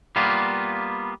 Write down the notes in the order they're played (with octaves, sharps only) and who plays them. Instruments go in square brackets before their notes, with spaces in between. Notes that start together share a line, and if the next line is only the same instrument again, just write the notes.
[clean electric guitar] G3 A#3 B3 F4